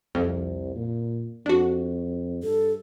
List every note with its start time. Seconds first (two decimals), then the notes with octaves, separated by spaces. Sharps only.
0.15 C2 F2
0.76 A#2
1.46 F2 D4 F#4
2.43 G2 A4